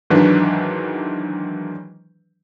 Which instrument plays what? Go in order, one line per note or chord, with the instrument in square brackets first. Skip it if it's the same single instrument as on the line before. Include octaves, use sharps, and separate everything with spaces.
[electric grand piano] G#2 D#3 E3 F#3 D4 B4